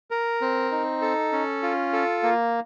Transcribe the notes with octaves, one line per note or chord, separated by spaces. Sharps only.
A#4
C4
D#4
A4
C#4
F4
A4
A#3